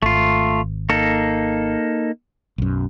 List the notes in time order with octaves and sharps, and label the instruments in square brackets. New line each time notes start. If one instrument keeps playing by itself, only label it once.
[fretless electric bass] G#1 [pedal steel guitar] A3 F4
[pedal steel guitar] A#3 D#4 A4
[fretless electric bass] B1 F#2